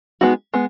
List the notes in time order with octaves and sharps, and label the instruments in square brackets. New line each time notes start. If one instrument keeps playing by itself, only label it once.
[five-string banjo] G#3 B3 D#4 F#4
G#3 B3